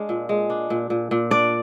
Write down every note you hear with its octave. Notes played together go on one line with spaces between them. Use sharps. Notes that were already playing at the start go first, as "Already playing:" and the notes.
Already playing: G#3 D4 F5
A#2
G#3
D4
A#2
A#2
A#2
D4 D5